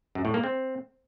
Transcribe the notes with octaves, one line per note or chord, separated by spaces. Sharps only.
F#2
A2
A#3
C4